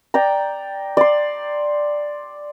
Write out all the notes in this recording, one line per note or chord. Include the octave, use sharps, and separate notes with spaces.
D5 G5 A#5
D5 C6